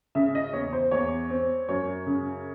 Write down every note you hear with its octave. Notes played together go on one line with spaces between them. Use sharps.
C#3 E5
D#5
E2 C#5
C5
E2 C#5
C4
F#2 C#5
C#3